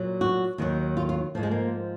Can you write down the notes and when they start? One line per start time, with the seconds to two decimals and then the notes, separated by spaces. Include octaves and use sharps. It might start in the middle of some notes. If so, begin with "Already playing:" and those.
Already playing: A#2 F#3
0.21 F#4
0.58 D#2 D#3 F#3
0.97 F4
1.09 F4
1.35 G#2 F3 A#3
1.43 G#3
1.51 A#3